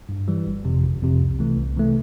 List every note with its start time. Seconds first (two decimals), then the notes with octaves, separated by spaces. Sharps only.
0.09 G2
0.28 E3 G3
0.46 G1
0.64 F2 C3
0.83 G1
1.02 F2 C3
1.20 C2
1.39 C3 E3 A3
1.57 C2
1.76 C3 E3 A3